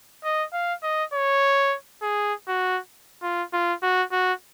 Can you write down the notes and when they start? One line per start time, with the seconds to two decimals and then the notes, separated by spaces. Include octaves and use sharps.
0.24 D#5
0.53 F5
0.83 D#5
1.14 C#5
2.02 G#4
2.48 F#4
3.23 F4
3.53 F4
3.83 F#4
4.12 F#4